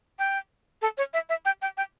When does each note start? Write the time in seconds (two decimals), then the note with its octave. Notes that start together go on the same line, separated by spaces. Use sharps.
0.19 G5
0.82 A4
0.98 C#5
1.14 E5
1.29 E5
1.45 G5
1.62 G5
1.77 G5